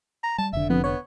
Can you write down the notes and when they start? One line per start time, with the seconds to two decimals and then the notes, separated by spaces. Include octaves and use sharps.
0.23 A#5
0.38 G3 A5
0.53 F1 D3 E5
0.70 F2 B3
0.84 B3 C#5